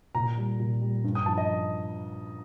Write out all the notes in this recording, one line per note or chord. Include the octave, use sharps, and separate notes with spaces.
A#2 A#5
G3
A#2
G3
G2
D#6
F3 A5
D#5